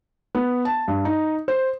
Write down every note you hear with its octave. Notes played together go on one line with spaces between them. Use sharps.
B3
A5
G2
D#4
C5